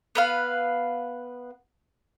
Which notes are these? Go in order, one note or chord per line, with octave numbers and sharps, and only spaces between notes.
B3 B4 F5